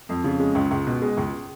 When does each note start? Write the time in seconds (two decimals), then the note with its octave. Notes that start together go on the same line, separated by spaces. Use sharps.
0.09 F2
0.24 C#3
0.40 G#3
0.55 C#2
0.71 C#2
0.86 B2
1.02 G#3
1.17 C#2